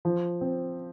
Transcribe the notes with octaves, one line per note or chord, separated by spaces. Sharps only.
F3
C4